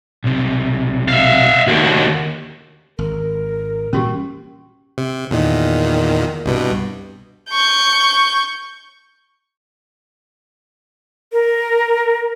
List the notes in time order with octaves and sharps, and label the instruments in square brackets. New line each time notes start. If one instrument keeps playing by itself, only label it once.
[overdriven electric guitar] B1 C3
[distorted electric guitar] E5 F5
[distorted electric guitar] D#2 D3 [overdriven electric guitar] F#4 G4
[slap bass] G#1 [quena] A#4
[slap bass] A#2 E3 G3 [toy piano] C#4 F#4 G4
[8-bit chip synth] C3
E2 A#2 D#3
C2 G2 B2
[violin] C#6 G6
[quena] A#4